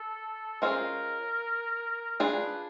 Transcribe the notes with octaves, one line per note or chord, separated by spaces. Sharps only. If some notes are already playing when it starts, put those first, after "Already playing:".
Already playing: A4
G#3 C#4 F4 G#4 A#4 C5
D4 F4 G#4 B4